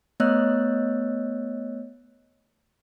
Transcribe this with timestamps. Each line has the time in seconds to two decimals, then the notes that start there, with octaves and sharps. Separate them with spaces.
0.20 A3 B3 C#5 D#5 E6 F#6